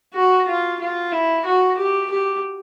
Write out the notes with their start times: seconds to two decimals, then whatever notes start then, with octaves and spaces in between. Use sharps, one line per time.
0.14 F#4
0.48 F4
0.80 F4
1.12 E4
1.45 F#4
1.77 G4
2.11 G4